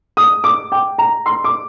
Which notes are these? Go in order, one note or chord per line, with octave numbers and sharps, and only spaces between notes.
D#6
D6
G5
A#5
C6
D6